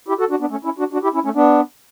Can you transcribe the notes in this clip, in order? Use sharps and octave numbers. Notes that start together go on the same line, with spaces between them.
E4 G4
F#4 A4
D4 F#4
B3 D4
A3 C#4
C#4 E4
D4 F#4
D4 F#4
E4 G4
C#4 E4
A3 C#4
B3 D4